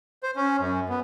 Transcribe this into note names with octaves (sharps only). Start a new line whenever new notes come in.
C5
C#4
F#2
B3